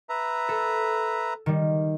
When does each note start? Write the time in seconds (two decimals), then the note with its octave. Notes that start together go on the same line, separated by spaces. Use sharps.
0.09 B4 E5 A#5
0.49 A4
1.46 D#3 G3